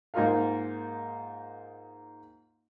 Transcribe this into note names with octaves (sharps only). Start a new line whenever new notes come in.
G#2 A#3 D#4 F4 A#4 F5